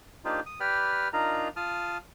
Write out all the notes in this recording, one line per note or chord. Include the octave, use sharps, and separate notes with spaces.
A#3 D4 D#4 F4 G4 C5
D#6
G4 B4 D5 G5 B5 F6
D4 D#4 F4 A#4 A#5
F4 A5 D#6 F6